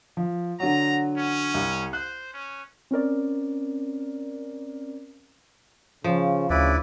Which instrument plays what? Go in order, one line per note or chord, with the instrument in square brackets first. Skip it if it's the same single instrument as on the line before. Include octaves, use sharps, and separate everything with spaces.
[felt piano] F3
[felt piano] D3 F#3 [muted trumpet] A#5
[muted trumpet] C#4
[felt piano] C2
[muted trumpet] C5 [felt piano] F#6
[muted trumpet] C#4
[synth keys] C4 C#4 A#4 D5
[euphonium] C#3 [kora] F3
[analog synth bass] D2 [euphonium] C#3 [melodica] E4 B4 D5